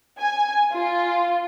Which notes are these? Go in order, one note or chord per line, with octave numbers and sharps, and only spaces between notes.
G#5
F4